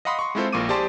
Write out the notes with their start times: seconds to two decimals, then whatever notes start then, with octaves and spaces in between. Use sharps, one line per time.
0.05 D#5 F5 F#5 B5 C6 D#6
0.19 C6 C#6
0.35 G#3 C4 E4 F4 A4 C5
0.52 A#1 A#3 F4 C#6 D6 D#7
0.69 G4 G#4 C5 D5 A5 C6